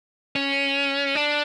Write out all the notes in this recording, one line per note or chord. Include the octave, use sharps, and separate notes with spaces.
C#4
D4